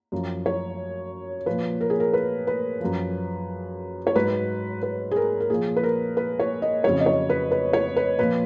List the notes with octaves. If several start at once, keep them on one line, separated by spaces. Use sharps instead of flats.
F#2 F3
C#5
A#2 F3 B4
A#4
G#4
A#4
B4
B4
F#2 F3
C#5
G#2 F#3 B4
B4
G#4
A#4
A#4
A#2 F3 G#4
B4
A#4
B4
C#5
D#5
F2 C#3 F#3 C#5
D#5
C#5
B4
B4
C#5
B4
A#2 F3 B4